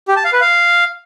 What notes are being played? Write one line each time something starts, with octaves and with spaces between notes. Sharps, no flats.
G4
A5
F5
B4
F5